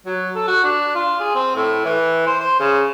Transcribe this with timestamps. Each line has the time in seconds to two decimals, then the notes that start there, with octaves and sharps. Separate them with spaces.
0.06 F#3
0.35 A4
0.48 F#4
0.64 D4
0.95 F4
1.20 G#4
1.35 C4
1.56 A2
1.85 E3
2.27 C5
2.41 C5
2.60 C#3